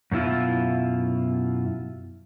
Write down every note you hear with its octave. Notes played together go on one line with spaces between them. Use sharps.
F#2 B2 B3 E4 F4